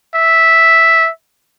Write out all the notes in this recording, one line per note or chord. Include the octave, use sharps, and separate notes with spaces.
E5